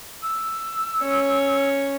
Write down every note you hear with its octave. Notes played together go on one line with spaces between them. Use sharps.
E6
C#4 C#5